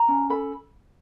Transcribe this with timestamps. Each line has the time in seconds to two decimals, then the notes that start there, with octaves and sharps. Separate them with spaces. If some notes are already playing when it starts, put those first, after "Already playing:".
Already playing: A#5
0.08 C#4
0.30 A4 B5